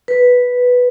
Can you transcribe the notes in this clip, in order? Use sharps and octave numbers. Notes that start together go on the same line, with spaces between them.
B4